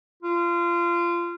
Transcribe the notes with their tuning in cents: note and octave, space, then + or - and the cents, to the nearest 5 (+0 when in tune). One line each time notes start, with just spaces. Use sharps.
F4 -25